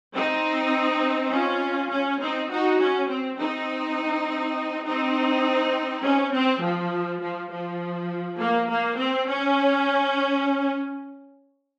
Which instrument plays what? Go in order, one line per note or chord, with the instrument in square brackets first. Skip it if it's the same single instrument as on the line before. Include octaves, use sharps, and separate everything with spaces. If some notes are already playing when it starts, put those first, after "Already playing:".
[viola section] C4 D#4
C#4 F4
C#4
C4 D#4
D#4 F#4
C#4
C4
C4 D#4
C4 D#4
C#4
C4
F3
F3
F3
A#3
A#3
C4
C#4